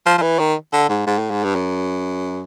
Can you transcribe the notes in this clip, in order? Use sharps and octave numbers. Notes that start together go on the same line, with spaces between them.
F3
F3
E3
D#3
D3
G#2
G#2
A2
G#2
G2
F#2